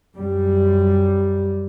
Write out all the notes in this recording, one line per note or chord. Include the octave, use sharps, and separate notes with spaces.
F#2 G3